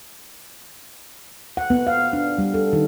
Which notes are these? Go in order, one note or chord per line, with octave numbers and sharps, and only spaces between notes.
F#5
B3
F5
D4
G3
A4
D#3